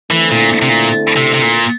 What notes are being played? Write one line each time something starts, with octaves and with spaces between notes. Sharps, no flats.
D3 E3 A3 C4 E4 A4
A#2
C3
A#2
C3
C3
A#2